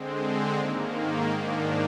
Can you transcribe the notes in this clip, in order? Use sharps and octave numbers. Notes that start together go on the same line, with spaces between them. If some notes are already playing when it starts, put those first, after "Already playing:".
Already playing: D3 G#3 C4
G#2 D#3 A#3
G#2 D#3 A#3 D4